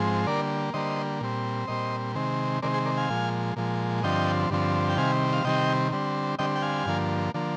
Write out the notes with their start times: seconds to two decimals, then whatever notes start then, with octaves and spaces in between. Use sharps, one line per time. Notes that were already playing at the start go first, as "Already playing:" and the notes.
Already playing: G#2 F3 G#3 C4
0.27 D3 G3 A#3 A#4 D5
0.74 D3 G3 A#3 C5 D#5
1.21 A#2 G3 C4
1.67 A#2 G3 C4 C5 D#5
2.15 C3 D#3 G#3 C4
2.62 C3 D#3 G#3 C4 A#4 D5
2.73 G#4 C5
2.86 A#4 D5
2.97 F5 G#5
3.10 A#2 F3 G#3
3.56 A#2 F3 G#3
4.03 G2 D3 F3 C4 D#5 G5
4.50 G2 D3 F3 C4
4.90 G5
4.97 C3 D#3 G3 C4 F5 G#5
5.33 F5
5.44 C3 D#3 G3 C4 D#5 G5
5.92 D3 G3 C4
6.39 D3 G3 C4 D#5 G5
6.56 G5
6.62 F5 G#5
6.85 G2 D3 F3 A#3
7.34 D3 F3 A#3